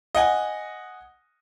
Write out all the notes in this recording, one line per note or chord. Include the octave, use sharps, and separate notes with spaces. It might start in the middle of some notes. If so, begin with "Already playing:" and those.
D#5 F#5 G#5